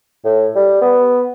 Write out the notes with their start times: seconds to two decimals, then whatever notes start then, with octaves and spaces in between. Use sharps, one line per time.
0.24 A2
0.55 G3
0.81 B3